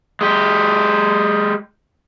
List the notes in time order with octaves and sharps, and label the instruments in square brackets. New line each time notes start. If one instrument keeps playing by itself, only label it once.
[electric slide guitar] G#3 G4